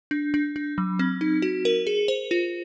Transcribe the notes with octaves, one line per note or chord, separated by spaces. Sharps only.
D4
D4
D4
F#3
C4
D#4
F#4
A#4
G#4
C5
F4